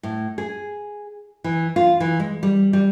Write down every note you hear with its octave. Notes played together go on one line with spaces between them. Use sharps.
A2
G#4
E3
F4
E3
G#3
G3
G3